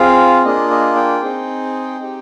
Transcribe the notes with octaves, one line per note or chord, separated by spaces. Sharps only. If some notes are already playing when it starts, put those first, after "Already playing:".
Already playing: C4 F4 G#4 F5
A#3 D4 F4 G#4 D#5
D#5
G5
C4 D#4 G#4
C4 D#4 G4